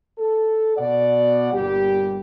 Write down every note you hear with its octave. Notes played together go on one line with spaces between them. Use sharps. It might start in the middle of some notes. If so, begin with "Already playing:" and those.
A4
B2 D5 F#5
G1 A#2 G3 G4